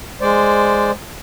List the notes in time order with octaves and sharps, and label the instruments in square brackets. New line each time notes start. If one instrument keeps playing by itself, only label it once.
[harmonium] G#3 C5 D5